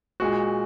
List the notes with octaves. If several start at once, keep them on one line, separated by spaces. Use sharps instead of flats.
A#2 G#3 F#4